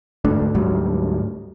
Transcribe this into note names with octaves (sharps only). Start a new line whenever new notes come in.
D2 G#2 A3 D4
D2 G#2 F#3 G3